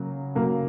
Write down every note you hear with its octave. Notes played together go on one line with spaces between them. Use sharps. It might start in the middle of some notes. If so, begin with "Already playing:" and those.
Already playing: C#3 F#3 A#3
C#3 F#3 A#3